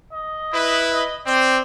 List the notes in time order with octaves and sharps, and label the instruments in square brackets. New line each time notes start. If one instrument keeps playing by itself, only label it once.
[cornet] D#5
[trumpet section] E4 B4
[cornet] D#5
[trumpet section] C4 [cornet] D5